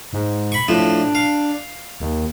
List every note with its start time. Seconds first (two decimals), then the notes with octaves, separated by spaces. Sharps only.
0.13 G#2
0.52 B5 C#6
0.68 A2 F3 D4
1.15 F5
2.00 D#2